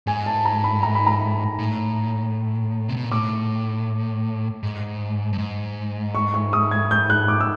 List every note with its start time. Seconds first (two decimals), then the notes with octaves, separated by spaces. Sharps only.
0.07 G#2 G#5
0.26 A5
0.45 A#5
0.64 B5
0.83 A#5
0.95 B5
1.07 A#5
1.59 A2
2.88 C3
2.97 B2
3.04 A#2
3.11 A2 D6
4.63 G#2
5.33 G2
5.38 G#2
6.15 C#6
6.34 C#6
6.53 D#6
6.71 G#6
6.91 G6
7.10 F#6
7.28 D6
7.40 E6